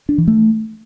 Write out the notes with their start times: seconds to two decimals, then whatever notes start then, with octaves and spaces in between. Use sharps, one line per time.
0.09 D4
0.18 E3
0.28 A3